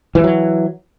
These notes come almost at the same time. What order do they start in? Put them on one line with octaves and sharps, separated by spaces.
E3 G3 F#3